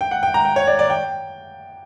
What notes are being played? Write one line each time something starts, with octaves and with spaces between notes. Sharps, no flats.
G5
F#5
G5
A#5
G5
C#5
D5
D5
G5